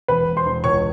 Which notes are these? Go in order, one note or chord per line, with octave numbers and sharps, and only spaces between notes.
E1 B4 B5
E1
C5 C6
E1
C#2 C#5 C#6